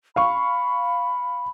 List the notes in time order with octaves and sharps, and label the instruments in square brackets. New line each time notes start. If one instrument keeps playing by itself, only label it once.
[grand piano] F5 C#6 [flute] B5